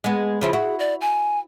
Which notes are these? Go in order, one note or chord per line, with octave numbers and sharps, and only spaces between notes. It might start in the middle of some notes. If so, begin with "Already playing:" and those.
G#3 B3
C#3 F3 E4 G#4
E4 F#4
D5
G#5